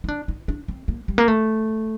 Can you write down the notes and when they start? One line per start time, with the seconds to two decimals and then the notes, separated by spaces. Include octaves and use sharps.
0.04 D#4
0.08 D4
0.28 D#4
0.48 D4
0.68 C4
0.88 A#3
1.08 G3
1.18 A#3
1.28 A3